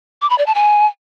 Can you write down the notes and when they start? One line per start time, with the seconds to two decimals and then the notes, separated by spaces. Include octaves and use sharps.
0.22 D6
0.30 B5
0.38 D5
0.46 A5
0.55 G#5